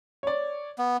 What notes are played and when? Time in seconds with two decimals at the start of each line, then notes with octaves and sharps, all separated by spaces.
0.23 C#5 D5
0.78 B3